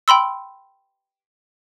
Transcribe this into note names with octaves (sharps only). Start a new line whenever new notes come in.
G5 B5 C6 E6